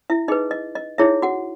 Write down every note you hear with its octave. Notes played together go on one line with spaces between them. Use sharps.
E4 E5
D#4 G#4 B4 D#5
D#5
D#5
D#4 E4 G#4 C#5 E5
F#4 F#5